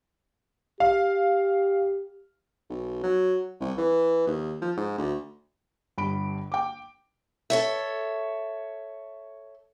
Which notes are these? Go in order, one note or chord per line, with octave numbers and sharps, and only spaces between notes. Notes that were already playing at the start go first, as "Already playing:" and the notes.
G4 F5
B1
F#3
C2
E3
D#2
F3
G#2
D2
G1 G2 B5 D7
G5 D6
A4 C#5 E5